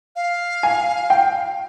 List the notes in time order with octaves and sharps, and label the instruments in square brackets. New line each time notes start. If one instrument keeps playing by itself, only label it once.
[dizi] F5
[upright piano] G#5
G5